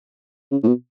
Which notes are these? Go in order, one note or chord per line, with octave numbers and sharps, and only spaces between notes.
C#3
A2
B2